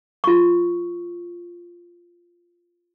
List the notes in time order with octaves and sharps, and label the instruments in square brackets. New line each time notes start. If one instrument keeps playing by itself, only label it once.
[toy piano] F4 C#6